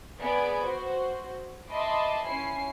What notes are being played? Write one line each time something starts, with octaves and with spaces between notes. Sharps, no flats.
B3 G#4 D5 B5 G#6 D7
F#4 C5
D#5 E5 A5 B5 C6 D6
C#4 E4 G#5 C7